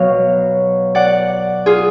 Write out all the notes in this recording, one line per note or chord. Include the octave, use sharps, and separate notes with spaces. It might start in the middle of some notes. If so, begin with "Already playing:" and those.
Already playing: B2 F#3 B3 C#5 F5
D5 F#5
F4 G#4